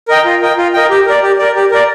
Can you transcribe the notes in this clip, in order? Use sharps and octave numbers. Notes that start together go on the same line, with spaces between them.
A#4 D#5 G5
F4
A#4 D#5 G5
F4
A#4 D#5 G5
G4
A#4 D5
G4
A#4 D5
G4
A#4 D5